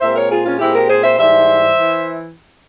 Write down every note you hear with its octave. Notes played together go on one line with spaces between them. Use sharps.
A#2 G#3 C4 C5 E5
A#4 C#5
F4 G#4
C#4 F4
A#2 G#3 C4 E4 G4
G4 A#4
G#4 C5
C5 E5
G#2 E3 G3 C5 E5
E3